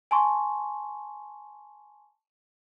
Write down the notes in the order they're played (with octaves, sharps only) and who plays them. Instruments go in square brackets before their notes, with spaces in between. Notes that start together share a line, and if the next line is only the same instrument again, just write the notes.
[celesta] G#5 A5 C6 C#6